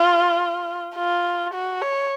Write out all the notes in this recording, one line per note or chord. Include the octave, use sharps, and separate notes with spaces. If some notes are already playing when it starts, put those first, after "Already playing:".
Already playing: F4
F4
F#4
C#5